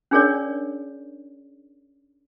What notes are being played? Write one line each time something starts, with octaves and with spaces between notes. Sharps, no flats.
C#4 D4 G#4 A#4 C#5 D5